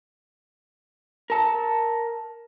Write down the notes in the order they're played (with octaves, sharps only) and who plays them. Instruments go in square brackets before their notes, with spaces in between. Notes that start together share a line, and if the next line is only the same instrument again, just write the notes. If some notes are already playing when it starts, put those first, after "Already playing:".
[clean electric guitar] A#4 A5